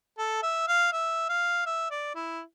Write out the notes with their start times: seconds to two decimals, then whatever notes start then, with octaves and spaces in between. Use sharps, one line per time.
0.19 A4
0.43 E5
0.68 F5
0.93 E5
1.29 F5
1.66 E5
1.91 D5
2.15 E4